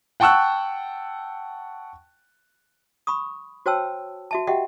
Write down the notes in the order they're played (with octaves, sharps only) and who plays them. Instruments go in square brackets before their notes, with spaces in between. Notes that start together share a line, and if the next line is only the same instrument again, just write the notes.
[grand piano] F#5 G5 A5 C#6 E6 F#6
[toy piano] B5 C#6 D#6
F#4 C5 C#5 G5 A5 E6
F#4 E5 A5
F#4 G4 D#5 E5 F#5 G5